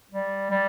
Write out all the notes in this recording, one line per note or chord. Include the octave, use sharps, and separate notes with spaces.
G3
G3